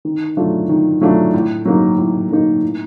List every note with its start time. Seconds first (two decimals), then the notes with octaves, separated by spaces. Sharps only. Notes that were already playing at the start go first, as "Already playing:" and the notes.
0.05 D#3
0.37 F#3 A3 D4 F4
0.69 D#3
1.01 F#3 A3 D4 F4
1.34 A2
1.65 F#3 A#3 D#4
1.98 A2
2.31 F#3 A#3 D#4
2.62 A2